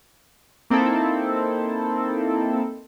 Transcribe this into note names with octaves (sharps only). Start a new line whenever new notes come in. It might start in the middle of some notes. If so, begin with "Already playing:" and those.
A#3 C4 D#4 E4 A4